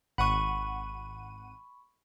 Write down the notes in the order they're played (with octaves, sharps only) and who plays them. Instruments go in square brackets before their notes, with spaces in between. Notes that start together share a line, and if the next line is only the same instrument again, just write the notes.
[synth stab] G#1 F#5 D#7 [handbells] B5 C#6